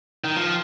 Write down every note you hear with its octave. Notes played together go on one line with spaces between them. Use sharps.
D#3
F3